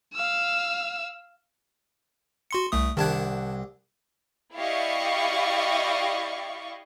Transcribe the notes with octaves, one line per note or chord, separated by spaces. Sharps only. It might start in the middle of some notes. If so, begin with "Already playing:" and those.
F5 E6
F#4 C6 C#7
C2 A3 D#6
C2 D#3 D4 F#5 A5 G#6
E4 G4 D5 D#5 F5 C#6